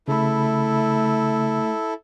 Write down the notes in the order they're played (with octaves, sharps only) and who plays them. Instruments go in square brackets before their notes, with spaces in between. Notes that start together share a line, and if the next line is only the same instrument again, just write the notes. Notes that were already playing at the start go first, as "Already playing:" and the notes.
[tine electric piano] C#3 B5 [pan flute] A3 [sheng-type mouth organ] E4 A4